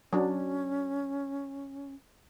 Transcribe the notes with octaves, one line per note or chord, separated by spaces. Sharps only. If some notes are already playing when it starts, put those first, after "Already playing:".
F#3 C#4 D4